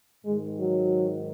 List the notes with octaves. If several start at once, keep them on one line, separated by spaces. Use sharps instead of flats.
G#2 D#3 G#3
F#3